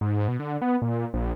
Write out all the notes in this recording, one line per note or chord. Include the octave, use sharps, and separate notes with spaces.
G#2
B2
D3
B3
A#2
A#1